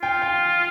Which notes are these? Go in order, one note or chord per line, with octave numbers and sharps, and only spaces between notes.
F4 G5
G5